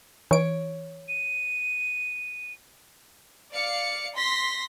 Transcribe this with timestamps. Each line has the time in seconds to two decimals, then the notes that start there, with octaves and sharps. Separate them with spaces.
0.31 E3 C#5 D7
1.08 D#7
3.52 D5 F5 C#7
4.16 C6 A#6 B6